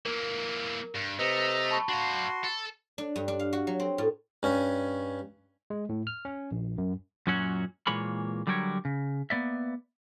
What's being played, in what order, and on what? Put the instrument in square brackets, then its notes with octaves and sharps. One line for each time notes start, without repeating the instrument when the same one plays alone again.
[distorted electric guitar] E3 A#3 [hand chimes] A#4
[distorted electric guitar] G2
[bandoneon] C3 D#5 A#5 [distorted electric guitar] A3 [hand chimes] B4
[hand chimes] A5 B5 C#6
[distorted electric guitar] D4 F5 [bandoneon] F#4 C6
[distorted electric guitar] A4
[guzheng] D4
G2
D4
F5
F#4
F#3
C4
A2
[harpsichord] G2 C#4
[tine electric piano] G#3
A2
F6
C#4
A#1
F#2
[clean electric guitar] F#2 A#2 F#3 C#4 F#4
A#2 E3 G#3 A#3 C#5 B5
D3 F#3 G3 G4 A#4 C#5
C#3
A#3 B3 D5 E5